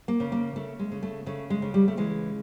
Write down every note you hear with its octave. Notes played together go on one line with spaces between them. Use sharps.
A#3
C#3
A#3
C#3 A3
G#3
C#3
A3
C#3 A3
G#3
C#3
G3
A3
E3 G#3